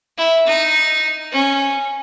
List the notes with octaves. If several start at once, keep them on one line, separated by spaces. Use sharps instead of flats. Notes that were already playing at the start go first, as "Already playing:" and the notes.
E4
D#4
C#4